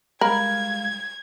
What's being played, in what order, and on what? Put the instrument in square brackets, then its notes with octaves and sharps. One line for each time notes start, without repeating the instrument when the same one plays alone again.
[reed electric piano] G3 G#3 F5 [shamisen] A#4 [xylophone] B5 [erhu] G#6